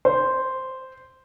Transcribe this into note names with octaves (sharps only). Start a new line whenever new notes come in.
C5